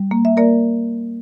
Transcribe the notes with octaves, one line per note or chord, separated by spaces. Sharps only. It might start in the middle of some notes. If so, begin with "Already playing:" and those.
Already playing: G3
A#3
E5
A#3 A#4 D5